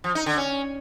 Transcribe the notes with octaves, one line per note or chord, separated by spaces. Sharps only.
F3
D#4
D3
C#4